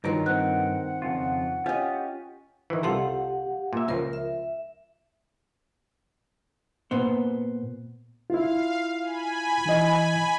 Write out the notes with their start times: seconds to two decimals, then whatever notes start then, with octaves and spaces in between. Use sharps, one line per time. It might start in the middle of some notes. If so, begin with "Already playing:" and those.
0.04 G2 D#3 F#3 F4 A#4
0.26 C4 F#5 F#6
1.02 F2 C#3 F4
1.66 C#4 F4 G4 D#5
2.70 D#3 E3
2.83 C2 F4 G4 A4 F5 F#5
3.73 A#2 E5
3.88 C#2 F3 F4 A#4
4.13 E5
6.91 A#2 B3 C5
8.30 E4 F4 F5
9.02 G#5 B5
9.65 E3 E4 D#5